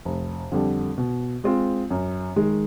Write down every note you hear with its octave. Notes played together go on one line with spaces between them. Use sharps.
F1
F2 D3 G3
B2
G#3 C4 F4
F#2
D#3 G#3